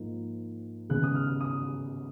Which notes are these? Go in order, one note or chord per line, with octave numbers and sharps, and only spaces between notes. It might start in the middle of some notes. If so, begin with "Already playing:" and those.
Already playing: G#2 F3 A#3
C#3 G#3 B3 F#6
D#6
F6
D#6